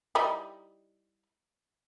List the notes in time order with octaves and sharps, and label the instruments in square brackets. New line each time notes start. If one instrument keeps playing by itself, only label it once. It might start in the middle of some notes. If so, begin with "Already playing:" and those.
[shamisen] G3 D#4 E4